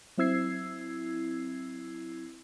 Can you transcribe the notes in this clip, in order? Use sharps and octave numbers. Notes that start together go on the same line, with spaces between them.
F#3 C4 E4 E6 G#6 C7